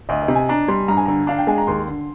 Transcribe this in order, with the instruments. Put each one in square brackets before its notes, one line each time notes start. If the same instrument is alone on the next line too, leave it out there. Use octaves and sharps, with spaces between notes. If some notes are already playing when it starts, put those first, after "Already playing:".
[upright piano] D2 [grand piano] D#5
[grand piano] D#5
[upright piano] C3
[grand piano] G#5
[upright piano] D4 [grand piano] A#5
[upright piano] G3 [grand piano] C6
[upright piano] G2 [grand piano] A#5
[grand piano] G#5
[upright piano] D3 [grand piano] A#5
[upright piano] D4 [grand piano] F5
[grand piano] G5
[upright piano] G#3 [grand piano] G#5
[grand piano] A#5
[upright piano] D#2 [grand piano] C6
[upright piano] D3